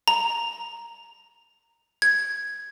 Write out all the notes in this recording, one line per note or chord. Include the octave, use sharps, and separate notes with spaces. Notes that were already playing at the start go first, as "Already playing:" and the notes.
A#5
G#6